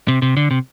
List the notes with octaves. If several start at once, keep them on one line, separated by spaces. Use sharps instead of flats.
C3
C3
D3
C3